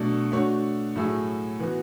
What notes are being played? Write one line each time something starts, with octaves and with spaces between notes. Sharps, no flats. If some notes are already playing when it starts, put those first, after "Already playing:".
Already playing: B2 F#3 A3 D4
A3 D4 F#4 C#5
A2 F#3 A3 E4 G#4
E3 B3 F#4